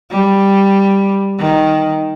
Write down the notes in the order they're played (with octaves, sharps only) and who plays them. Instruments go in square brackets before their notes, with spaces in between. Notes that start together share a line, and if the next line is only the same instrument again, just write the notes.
[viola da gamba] G3
D#3